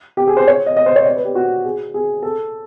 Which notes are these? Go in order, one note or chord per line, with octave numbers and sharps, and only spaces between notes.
G4
G#4
C5
C#5
D#5
D#5
C5
C#5
D5
B4
G4
F#4
G#4
G#4
A4